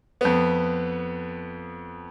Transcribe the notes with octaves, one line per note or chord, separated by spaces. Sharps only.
F2 B3